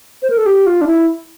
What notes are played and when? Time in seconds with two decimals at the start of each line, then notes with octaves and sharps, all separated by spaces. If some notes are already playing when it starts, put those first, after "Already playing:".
0.22 C5
0.30 A#4
0.37 A4
0.46 G4
0.66 F4
0.81 D4
0.87 E4